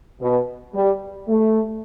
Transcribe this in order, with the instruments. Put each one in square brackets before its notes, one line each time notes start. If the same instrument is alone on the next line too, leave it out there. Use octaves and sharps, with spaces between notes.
[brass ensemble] B2
G3
A3